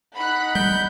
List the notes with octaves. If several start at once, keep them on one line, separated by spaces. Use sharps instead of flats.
D#4 F#5 B5 F#6
G3 G6